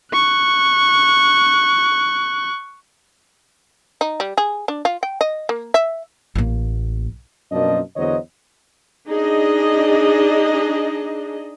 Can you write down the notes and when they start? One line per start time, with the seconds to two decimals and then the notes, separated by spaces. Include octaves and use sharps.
0.13 C#6 F#6
4.01 D#4
4.20 G3
4.38 G#4
4.68 D4
4.85 F4
5.03 G5
5.21 D#5
5.49 A#3
5.74 E5
6.35 A1 A#3
7.52 F#2 B2 F3 A#3 D4 D#5
7.96 E2 D3 F#3 C5 C#5 D#5
9.09 D4 D#4 G#4 D#5